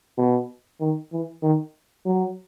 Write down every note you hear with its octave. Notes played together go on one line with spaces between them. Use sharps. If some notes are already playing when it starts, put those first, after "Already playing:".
B2
D#3
E3
D#3
F#3